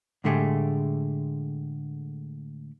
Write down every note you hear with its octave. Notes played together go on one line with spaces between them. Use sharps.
A2 D3 G#3 A3 G4 G#4